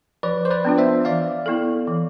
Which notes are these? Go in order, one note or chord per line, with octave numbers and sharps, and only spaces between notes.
F3 B4 D5
C5
B4 D5
B3 D4 F4
C5 E5
E3 D5 F5
B3 E4 A4
E3